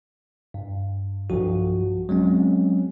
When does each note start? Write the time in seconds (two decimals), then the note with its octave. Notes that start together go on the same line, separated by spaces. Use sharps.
0.54 G2
1.30 B1 G2 F3 F#4
2.09 F#3 G#3 C4 C#4